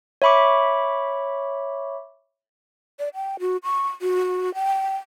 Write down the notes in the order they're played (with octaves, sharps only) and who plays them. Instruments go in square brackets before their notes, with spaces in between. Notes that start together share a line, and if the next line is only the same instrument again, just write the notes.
[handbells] C#5 E5 B5 C#6 D6
[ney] D5
G5
F#4
C#6
F#4
G5